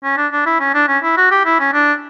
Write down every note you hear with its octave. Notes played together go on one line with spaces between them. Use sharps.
C#4
D4
D4
E4
C#4
D4
C#4
E4
F#4
G4
E4
C#4
D4